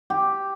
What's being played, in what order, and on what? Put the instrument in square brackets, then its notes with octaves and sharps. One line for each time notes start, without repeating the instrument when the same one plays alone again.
[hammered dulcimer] G4